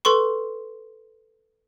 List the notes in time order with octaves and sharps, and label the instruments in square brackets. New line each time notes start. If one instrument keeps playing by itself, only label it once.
[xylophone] A4 B4 C6 C#6